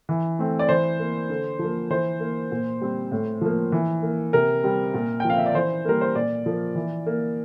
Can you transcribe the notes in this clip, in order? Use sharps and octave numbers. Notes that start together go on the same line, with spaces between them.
E3
A3 C4
D5
E3 C5
A#3
D3
F3 A#3
E3 C5
A#3
A#2
G3 C4
A2
F3 A#3
E3
A#3
C3 A#4
G3 C4
A#2
G5
F3 C4 F5
E5
D5
E3 C5
G3 A#3 A#4
C5
A#2 D5
F3 A#3
E3
A#3